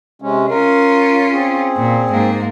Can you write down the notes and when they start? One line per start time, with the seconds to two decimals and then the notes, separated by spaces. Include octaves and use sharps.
0.22 C3 G#3 C#4
0.50 C#4 F4 A#4
1.32 C4 G#4
1.76 A#2
2.12 G#2 A#3